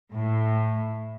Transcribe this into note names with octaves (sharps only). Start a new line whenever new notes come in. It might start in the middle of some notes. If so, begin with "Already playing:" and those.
A2